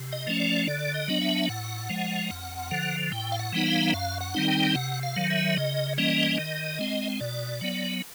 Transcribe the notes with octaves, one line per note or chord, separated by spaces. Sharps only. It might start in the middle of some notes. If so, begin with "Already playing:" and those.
Already playing: C3
D#5
F3 A3 C#4
D5
D3 D5
D#5
F#3 B3 D4
E5
A2 F#5
F3 G#3
F2
D3 F3
A2 G5
F5
F#5
E3 G3 B3 D#4
F5
F#2 F5
F#5
D#3 G3 C4 D#4
G5
C3 F#5
F5
D#3 F#3
E5
C#3 D#5
E3 G3 A#3 C#4 D#5
D#3
G#3 C4
B2 D5
F#3 B3